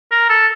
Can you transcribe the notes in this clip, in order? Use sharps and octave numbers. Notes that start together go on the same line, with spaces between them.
A#4
A4